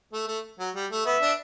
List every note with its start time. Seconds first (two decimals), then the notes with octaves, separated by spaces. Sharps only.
0.13 A3
0.28 A3
0.59 F#3
0.75 G3
0.91 A3
1.06 B3 E5
1.21 D4